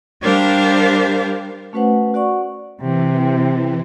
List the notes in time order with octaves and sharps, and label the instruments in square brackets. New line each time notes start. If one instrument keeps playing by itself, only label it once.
[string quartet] G3 D4 G4 A#4 C5 F5
[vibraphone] A3 C#4 F#4 B4 C5 F#5
F#4 D5 F#5 C#6
[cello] C3 [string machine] E3